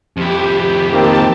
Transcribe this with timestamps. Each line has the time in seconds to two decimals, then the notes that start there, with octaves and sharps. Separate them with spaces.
0.17 F2 E4 G4
0.93 D#3 A#3 C4 G4 A5